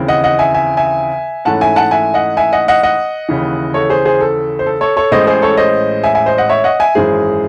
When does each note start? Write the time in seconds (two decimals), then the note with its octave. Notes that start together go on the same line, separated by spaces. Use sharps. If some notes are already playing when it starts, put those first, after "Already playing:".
Already playing: D#2 C#3 E3 C4
0.08 D#5 F#5
0.24 D#5 F#5
0.39 E5 G#5
0.54 E5 G#5
0.77 E5 G#5
1.45 G#2 E3 A3 C#4 F#5 A5
1.61 E5 G#5
1.76 F#5 A5
1.91 E5 G#5
2.14 D#5 F#5
2.37 E5 G#5
2.52 D#5 F#5
2.68 D#5 F#5
2.83 D#5 F#5
3.29 D#2 C#3 E3
3.74 A4 C#5
3.90 G#4 C5
4.05 G#4 C5
4.20 A4
4.59 C5
4.66 A4
4.81 A4 C#5
4.96 A4 C#5
5.11 A1 A2 G#3 C5 D#5
5.27 G#4 C5
5.42 A4 C#5
5.57 C5 D#5
6.03 E5 G#5
6.15 E5 G#5
6.26 C5 D#5
6.38 D#5 F#5
6.49 C#5 E5
6.64 D#5 F#5
6.80 E5 G#5
6.95 G#1 F#2 E3 G#3 G#4 C5